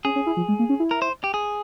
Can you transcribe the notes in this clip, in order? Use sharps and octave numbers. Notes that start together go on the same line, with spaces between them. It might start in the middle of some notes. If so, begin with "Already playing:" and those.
C#4 G#4
C#4
E4
F3
G#3
A#3
C#4
E4
A#4
C5
G4
G#4